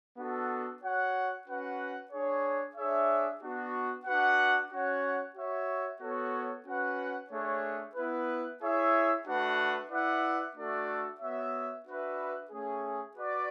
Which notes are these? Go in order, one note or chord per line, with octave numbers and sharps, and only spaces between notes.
B3 D4 F#4 A4
F#4 C#5 F#5
C#4 F#4 B4 F#5
D4 G#4 C#5
D4 G#4 C#5 E5
B3 D4 F#4
D4 F#4 B4 F#5
C#4 F#4 C#5 F#5
F#4 C#5 E5
B3 F#4 A4 C#5
C#4 F#4 B4 F#5
A3 D4 G#4 C#5
B3 E4 B4
E4 G#4 C#5 E5
A3 D4 F#4 B4 F#5
E4 B4 D5 F#5
A3 D4 F#4 A4 D5
B3 F#4 C#5 E5
D4 F#4 B4 E5
A3 C#4 G#4
F#4 B4 D5